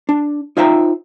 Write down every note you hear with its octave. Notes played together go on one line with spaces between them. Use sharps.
D4
D#4 F4 C5 E5 G5 A#5